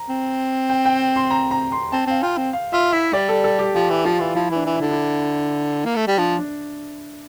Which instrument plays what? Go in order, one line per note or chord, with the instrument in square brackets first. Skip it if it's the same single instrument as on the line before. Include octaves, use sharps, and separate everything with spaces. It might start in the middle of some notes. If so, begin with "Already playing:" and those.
Already playing: [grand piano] A#5
[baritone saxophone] C4
[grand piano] G5
G5
C6
A#5
A#5
C6
[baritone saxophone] C4 [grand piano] A5
[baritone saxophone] C4 [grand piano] F5
[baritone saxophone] F4 [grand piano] G5
[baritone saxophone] C4
[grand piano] F5
[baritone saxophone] F4 [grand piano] E5
[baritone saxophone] E4 [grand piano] E5
[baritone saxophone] G3 [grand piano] D5
[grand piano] A4
A4
G4
[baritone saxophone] F3 [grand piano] G4
[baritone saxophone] E3
[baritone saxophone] F3 [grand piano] F4
[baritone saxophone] E3
[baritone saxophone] F3 [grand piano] E4
[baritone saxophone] E3 [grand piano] D4
[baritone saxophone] E3
[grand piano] E4
[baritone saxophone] D3 [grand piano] D4
[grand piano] E4
[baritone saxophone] A#3
A3
G3
[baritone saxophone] F3 [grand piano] D4
[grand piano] D4